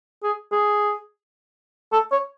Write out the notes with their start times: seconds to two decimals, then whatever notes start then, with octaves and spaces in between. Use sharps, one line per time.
0.23 G#4
0.52 G#4
1.92 A4
2.12 C#5